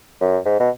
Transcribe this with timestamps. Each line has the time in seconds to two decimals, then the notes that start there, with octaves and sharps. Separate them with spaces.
0.21 F#2
0.46 G#2
0.60 B2